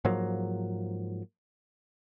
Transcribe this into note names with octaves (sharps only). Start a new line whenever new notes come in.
G#2 F3 F#3 A#3